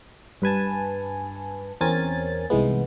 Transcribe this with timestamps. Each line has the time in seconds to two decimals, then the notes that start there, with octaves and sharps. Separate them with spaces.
0.42 G2 B4 G#5 A5
1.81 E2 C4 C#4 A#4 G#5 A6
2.50 C2 G#2 E3 G#3 B3